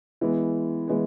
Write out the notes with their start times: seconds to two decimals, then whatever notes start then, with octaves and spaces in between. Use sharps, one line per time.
0.21 E3 G#3 B3
0.88 E3 G#3 B3